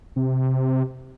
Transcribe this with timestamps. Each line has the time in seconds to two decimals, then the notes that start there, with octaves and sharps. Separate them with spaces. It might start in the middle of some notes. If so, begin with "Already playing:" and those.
0.16 C3